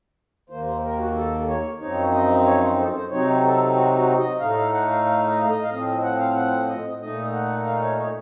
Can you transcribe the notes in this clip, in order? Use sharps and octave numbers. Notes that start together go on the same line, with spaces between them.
D#2 D#3 A#3 C5
C5
A#4
F#4
A4
C#5
F#2 F3 C4 D#4 C#5
D#5
C#5
C5
A4
C5
C3 F#3 C4 D#4 C#5
A4
F#4
F#4
D#5
A2 A3 D#4 F5
F5
F#5
F5
F5
D#5
F5
D#5
F5
A2 F3 C4 D#5
D#5
F#5
F5
F#5
D#5
A#2 A3 D#4 D#5
F#5
F5
C#5
C#5